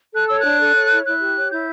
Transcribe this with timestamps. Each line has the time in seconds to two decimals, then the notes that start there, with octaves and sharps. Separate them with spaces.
0.14 A4 F#6
0.27 C#5 E6
0.39 F#6
0.44 D4
0.60 A4
0.75 C#5
0.90 E4
1.06 E4 F#6
1.21 G4
1.36 C#5
1.51 E4 G6